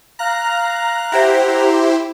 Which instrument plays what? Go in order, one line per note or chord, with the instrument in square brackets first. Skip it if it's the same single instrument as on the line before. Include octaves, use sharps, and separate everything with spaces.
[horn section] F5 A#5 [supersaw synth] F#6
[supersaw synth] E4 G4 C5 [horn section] F#5 A#5